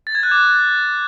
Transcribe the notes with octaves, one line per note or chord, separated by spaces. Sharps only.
A6
G#6
F#6
D6